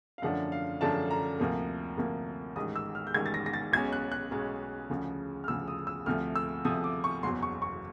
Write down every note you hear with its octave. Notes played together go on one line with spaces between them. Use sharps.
F5
F#2 D3 F3 A3 D4 F#5
F5
F#2 D3 F3 A3 D4 A5
A#5
D2 C3 F3 A#3
D2 C3 F3 A#3
A1 G#2 D#3 D#6
E6
F6
G6
A1 G#2 D#3 G#6
A6
A#6
A#6
A6
B1 B2 G#3 C#4 G#6
F#6
F#6
B1 B2 G#3 C#4
D2 C#3 F3
F6
D2 C#3 F3 E6
D#6
E6
D2 C3 F3 A3 F6
E6
D2 C3 F3 A3 D#6
D6
C#6
F#1 E2 B2 F#3 C6
C#6
C#6